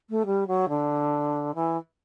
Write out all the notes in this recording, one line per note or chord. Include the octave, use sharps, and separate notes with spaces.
A3
G3
F#3
D3
E3